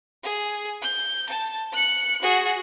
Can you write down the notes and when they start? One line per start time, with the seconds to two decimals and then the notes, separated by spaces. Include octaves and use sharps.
0.23 G#4
0.82 G6
1.29 A5
1.73 F#6 C#7
2.22 F#4 G#4